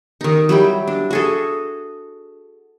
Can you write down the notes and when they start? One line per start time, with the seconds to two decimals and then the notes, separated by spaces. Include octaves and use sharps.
0.21 D#3 D#4
0.49 F#3 G3 E4 G5
0.87 D4
1.11 F#4 G#4 A4